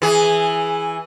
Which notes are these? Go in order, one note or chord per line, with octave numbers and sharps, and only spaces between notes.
E3 G#4